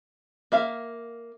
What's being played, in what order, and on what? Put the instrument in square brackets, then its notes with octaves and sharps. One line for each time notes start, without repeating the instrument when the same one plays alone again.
[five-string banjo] A#3 E5 F5